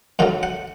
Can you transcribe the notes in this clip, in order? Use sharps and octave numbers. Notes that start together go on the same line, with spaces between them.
F#2 D3 F#3 F5
F#5